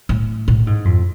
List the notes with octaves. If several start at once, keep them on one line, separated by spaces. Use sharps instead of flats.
A2
A2
G#2
F2